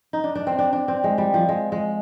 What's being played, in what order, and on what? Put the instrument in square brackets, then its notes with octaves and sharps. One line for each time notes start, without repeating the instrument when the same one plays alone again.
[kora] D#4
D4
D4
C4
D4
D4
C4
G#3
G3
F3
G#3
G#3